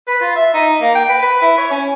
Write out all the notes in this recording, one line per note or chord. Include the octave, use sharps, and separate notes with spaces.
B4
F4
E5
D#4
A#3
G5
B4
B4
E4
C#5
C#4